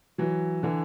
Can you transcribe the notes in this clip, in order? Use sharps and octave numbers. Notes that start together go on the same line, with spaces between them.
E3 F#3
D3 E3